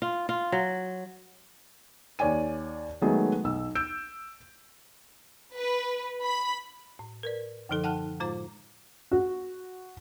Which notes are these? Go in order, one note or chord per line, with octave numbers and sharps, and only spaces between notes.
F4
F4
F#3
D#2 C#5 D5 G#5 D#7
D#3 F#3 G#3 A3 B3 G#4
B1 E6
E6 G6 D7
B4
B5
A2
A#4 B4 D5
F#2 D3 F3 D#4 A4
F#5 G5 A5 F6 F#6
A2 G#3 F4 C5 A#5 D6
F#4